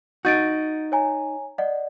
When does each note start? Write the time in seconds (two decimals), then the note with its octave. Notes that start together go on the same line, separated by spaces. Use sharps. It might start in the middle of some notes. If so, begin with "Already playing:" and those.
0.25 D#4 F#4 G6 A6 D7
0.92 C#5 G#5 A#5
1.58 D5 D#5 F#5